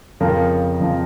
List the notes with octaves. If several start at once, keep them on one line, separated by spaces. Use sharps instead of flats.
F2 C#3 F3 A#4
F2 C#3 F3